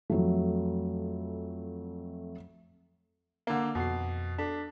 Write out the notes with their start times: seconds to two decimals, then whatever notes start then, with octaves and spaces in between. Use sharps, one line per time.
0.10 F2 F#3 A3
3.47 D3 A#3
3.75 F2 B2 C7
4.38 D4 A4 B6